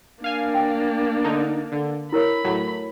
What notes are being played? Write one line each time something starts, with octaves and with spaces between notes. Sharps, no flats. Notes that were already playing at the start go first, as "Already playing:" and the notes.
A#3 D4 F5 G#5
D#5 G5
D3 D#4
D3
E4 A#4 C#5 B5
A2 F#3